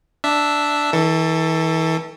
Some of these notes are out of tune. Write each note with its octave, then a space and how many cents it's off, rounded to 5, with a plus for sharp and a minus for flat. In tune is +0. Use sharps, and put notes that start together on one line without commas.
D4 +0 E5 +0
E3 -35 A4 +10